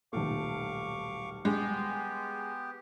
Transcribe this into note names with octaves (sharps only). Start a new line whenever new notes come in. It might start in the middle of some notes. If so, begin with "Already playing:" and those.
D#1 B1 A3 F5 C#6 D6
G#3 B3 G4